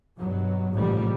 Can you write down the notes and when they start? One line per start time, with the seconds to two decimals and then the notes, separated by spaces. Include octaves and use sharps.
0.19 G2 B2 F#3
0.74 A1 G#2 C3 F3 G3